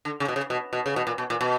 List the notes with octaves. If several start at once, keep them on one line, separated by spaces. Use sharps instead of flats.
D3
C#3
B2
C#3
B2
B2
C#3
B2
A#2
B2
A#2
B2